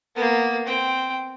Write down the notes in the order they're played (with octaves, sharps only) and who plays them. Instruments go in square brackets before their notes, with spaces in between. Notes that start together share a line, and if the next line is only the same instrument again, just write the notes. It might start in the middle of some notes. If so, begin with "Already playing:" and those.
[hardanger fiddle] A#3 B3
C4 G5